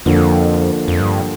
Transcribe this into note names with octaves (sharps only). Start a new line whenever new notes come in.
F2 D3 F3 A#3
F2
G2